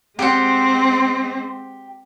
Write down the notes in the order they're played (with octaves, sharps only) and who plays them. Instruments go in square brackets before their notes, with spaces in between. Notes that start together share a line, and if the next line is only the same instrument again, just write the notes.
[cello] G#3 C4 [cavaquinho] G4 F#5